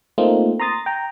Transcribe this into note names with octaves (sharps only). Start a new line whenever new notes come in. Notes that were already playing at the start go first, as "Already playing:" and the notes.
A3 A#3 C4 D#4 F4
A#5 C6 D#6 A6
G5 A#5